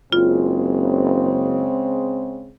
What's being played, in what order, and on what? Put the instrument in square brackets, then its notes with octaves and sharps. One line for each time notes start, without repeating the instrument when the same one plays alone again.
[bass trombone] F#1 [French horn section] C#3 G#3 C4 [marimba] F4